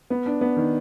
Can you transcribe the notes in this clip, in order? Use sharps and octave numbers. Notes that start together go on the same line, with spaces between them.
B3
D4
B3
D#3